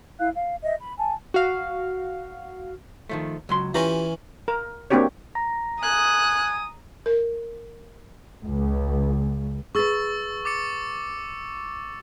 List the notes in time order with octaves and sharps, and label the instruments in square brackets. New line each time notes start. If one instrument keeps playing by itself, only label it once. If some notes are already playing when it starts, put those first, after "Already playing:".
[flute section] E4 F5 F#6
F5
D#5 E5
B5
G#5 A5
[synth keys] F#4 F5
[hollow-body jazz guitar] D#3 F3 A3
C#2 F#3 C6
[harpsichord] E3 C#4 [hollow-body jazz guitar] F4 G4 A#5
[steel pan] A#4
A#3 C4 D4 F#4 G4 C#5
[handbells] A#5 A#6
[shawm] G#5 [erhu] D#6 [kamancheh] F#6
[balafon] A#4
[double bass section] C#2
[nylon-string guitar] G#4 B4 [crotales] C#6 E6 A6
[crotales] D6 A6 C#7